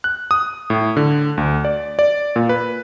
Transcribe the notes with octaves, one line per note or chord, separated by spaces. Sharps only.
F#6
D#6
A2
D3
D2
D5
D5
A#2
B4